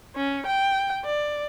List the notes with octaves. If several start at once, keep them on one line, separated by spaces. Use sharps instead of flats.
C#4
G5
D5